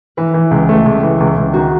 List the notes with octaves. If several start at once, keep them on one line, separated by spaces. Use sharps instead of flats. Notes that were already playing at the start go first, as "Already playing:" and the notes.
E3 B4
E3
C#2
A3
C#2
E3
C#2
C#2
D#3 F#4